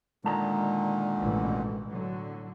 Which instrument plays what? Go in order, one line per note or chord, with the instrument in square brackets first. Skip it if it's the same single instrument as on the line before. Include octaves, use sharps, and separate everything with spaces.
[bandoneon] A#2 D3 D#3 [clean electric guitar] G#3 A5 A#5
[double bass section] A1 B2 E3
A2 D3 F#3